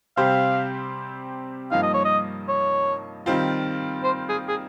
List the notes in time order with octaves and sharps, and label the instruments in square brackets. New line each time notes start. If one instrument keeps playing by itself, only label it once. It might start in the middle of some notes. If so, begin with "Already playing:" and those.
[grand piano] C3 G3 C4 G4 C5 [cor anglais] F5
[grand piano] G2 F3 A#3 D#4 [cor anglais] F5
[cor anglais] D#5
C#5
D#5
C#5
[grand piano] D#3 G3 C4 F4
[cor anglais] C5
G#4
G#4